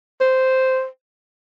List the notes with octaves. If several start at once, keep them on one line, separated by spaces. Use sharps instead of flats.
C5